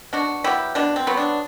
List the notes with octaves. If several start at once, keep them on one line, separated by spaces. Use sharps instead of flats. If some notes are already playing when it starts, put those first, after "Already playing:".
B2 D4 F#4
F#3 B3 E4 G4
B2 D4
C4
F#3 B3
D4